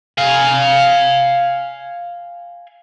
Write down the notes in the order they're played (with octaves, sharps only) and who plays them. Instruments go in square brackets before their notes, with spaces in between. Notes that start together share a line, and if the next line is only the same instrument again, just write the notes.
[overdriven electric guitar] F5 G#5